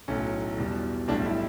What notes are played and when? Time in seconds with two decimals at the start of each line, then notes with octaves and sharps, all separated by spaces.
0.08 B1 A2 F#3 C#4
0.58 E2 B2 G3
1.08 B1 A2 G3 D4
1.26 E4